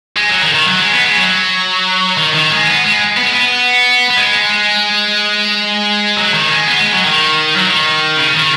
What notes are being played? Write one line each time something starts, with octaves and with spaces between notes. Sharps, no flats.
G#3
F#3
D#3
D#3
F#3
G#3
B3
G#3
F#3
D#3
D#3
G#3
B3
G#3
B3
G#3
B3
B3
G#3
F#3
D#3
G#3
B3
G#3
F#3
D#3
F#3
D#3
C#3
D#3